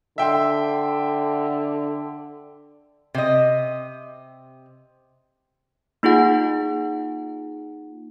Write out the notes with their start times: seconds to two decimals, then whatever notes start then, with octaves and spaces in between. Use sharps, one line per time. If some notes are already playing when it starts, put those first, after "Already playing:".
0.18 D3 E5 G5 C6
3.14 C3 D#5
6.03 A#3 D#4 F4 G#4 F#5